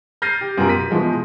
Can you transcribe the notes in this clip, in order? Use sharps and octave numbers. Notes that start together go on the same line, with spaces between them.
F6 G6 A6 A#6 C7 D#7
G4
F#2 B2 F4 G4 A#4
B6 D#7
B2 E3 F3 G#3